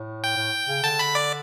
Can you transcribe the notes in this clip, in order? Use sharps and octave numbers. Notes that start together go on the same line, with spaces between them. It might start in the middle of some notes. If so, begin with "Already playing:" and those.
Already playing: A2
G5
A2
C#3
D3 A5
B5
D5